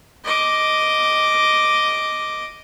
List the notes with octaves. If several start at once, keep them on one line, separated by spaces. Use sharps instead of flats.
D#5 D6